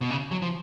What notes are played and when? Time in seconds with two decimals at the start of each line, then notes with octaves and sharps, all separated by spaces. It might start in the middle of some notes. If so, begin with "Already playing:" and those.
0.01 B2
0.10 C#3
0.31 F#3
0.42 F3